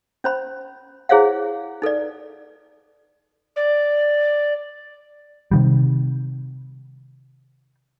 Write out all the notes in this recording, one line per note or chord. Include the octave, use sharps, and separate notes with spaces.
C#4 C5 B5
E4 G#4 C5 C#5 F5 F#5
D#4 A4 B4 D5
D5
C3 D#3 G3